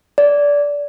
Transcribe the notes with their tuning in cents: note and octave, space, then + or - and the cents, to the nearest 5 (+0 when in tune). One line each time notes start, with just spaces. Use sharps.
D5 -20